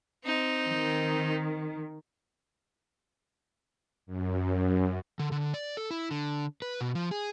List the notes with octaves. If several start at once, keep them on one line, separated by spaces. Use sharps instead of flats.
C4 D#4
D#3
F#2
D3
D3
D5
A4
E4
D3
B4
B2
F3
G#4